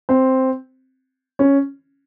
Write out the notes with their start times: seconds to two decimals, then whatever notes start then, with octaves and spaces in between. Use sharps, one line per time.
0.09 C4
1.39 C#4